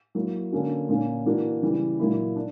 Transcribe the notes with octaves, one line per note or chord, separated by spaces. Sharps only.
F#3 A#3 E4
D3 A#3 C#4 F#4
A#2 A#3 C#4
E3 A#3 D4 F#4
C#3 E3 G3
A#2 F#3 A#3 E4
D4